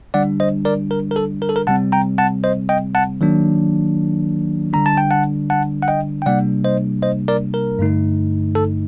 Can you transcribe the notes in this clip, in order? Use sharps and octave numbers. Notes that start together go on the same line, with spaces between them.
D3 G3 D4 D5 F#5
C5 D#5
A#4 D5
A#4
A#4
A4
A#4
A4
A#4
C3 G3 C4 F#5 A5
G5 A#5
F#5 A5
C5 D#5
D#5 G5
F#5 A5
D#3 F#3 A#3 D4
D3 G3 D4 A#5
A5
G5
F#5 A5
F#5 A5
F#5
D#5 G5
G5
C3 G3 A#3 D4 D5 F#5
C5 D#5
C5 D#5
A#4 D5
A#4
G2 D3 A3 D#4
A4